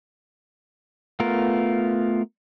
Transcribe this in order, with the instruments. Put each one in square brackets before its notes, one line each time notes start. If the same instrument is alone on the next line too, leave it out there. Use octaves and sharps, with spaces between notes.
[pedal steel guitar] A3 B3 F4 A#4